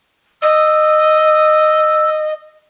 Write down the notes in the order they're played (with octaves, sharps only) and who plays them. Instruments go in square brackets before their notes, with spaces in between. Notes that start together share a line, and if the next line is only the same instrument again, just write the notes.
[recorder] D#5 [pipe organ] E6